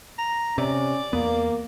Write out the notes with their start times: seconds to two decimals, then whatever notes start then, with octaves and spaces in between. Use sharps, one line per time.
0.18 A#5
0.58 C3 C#4 D5
1.13 E2 A#3 B3